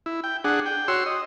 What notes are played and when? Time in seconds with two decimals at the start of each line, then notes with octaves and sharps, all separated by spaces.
0.06 E4
0.24 G5
0.44 D4 G#4 F#5
0.66 G5
0.88 F#4 C#5 C6 E6
1.06 D#5